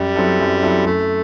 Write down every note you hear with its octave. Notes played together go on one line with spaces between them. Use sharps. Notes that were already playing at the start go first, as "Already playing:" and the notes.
Already playing: F#2 G3
F#3 C4 E4 A4
F#2
F#3 C4 E4 A4
F#2 A3